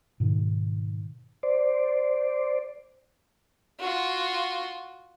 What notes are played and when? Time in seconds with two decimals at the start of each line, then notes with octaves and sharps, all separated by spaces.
0.20 G#2 B2 D#3
1.43 C5 D5
3.79 F4 F#4